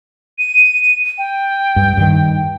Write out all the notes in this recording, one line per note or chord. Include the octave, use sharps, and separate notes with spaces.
D#7
G5
G2
G2 D#3